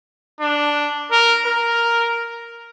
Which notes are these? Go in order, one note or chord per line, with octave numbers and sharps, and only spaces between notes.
D4
A#4
A#4